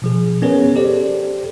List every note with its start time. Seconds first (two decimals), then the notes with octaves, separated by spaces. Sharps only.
0.02 B2 F3 G#4
0.42 B3 C#4 G#4 A#4 B4 C#5
0.76 G4 A4 C5 D5